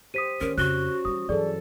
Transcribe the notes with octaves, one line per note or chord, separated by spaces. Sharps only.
G4 C5 D#6 B6 D#7
D#3 A#3 C#4 A#4
F2 C#3 F#4 F#6 G7
E3 G3 D#6
G2 E3 F#3 G#4 A4 D5